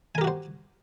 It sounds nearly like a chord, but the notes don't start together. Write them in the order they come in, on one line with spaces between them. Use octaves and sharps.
G#5 A#4 G4 F#4 C5